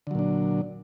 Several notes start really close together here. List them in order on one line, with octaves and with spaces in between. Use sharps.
D3 F#3 A#2 D4